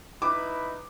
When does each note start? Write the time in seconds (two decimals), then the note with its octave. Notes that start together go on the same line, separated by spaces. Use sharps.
0.22 D#4 E4 B4 D6